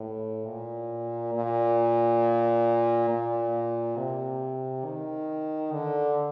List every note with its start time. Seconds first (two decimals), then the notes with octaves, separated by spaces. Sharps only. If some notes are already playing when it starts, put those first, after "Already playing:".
Already playing: A2
0.47 A#2
1.34 A#2
3.09 A#2
3.97 C3
4.85 D#3
5.72 D3